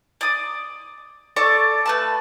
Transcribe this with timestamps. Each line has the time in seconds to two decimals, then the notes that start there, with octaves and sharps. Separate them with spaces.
0.21 D5 D#6
1.36 A4 D5 A5 C#6
1.86 A3 B4 A5